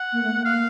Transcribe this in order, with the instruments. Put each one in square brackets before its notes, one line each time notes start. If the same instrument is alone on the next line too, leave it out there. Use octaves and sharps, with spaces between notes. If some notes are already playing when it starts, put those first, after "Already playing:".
Already playing: [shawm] F#5
[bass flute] A#3
A3
A#3
[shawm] F5